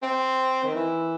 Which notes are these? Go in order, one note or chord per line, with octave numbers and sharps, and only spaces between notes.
C4
D#3
E3